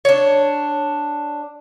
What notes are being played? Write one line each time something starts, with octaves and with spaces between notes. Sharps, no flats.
D4 C#5